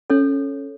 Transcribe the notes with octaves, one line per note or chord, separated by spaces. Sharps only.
C#4 A4 C#5